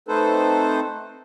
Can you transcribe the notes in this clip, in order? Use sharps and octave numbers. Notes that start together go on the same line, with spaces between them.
A3 C4 D#4 A4 B4 C5